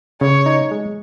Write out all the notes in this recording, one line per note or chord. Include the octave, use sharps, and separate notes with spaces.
C#3 C#5
D#4
G#3